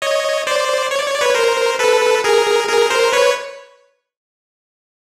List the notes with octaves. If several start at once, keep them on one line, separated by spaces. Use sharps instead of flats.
C#5 D#5
C5 D5
C#5
D5
C#5
D5
B4 C#5
A#4 C5
A4 B4
G#4 A#4
G#4 A#4
A#4 C5
B4 C#5